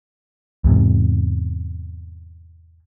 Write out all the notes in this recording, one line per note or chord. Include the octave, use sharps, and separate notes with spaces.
E2 G#2 C3